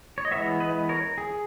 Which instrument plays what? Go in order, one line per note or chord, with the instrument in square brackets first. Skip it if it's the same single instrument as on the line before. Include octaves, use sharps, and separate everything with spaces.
[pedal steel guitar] C#5
D#5
E3 G#3 B3 C#5 E5
B4 D#5
A#4 C#5
G#4